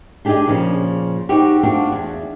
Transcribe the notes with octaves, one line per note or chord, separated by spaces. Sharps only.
D4 G4 G#4 D5 D#5
A#2 C#3 F3
C4 D#4 F#4 G4
C4 D4 F4 F#4
E2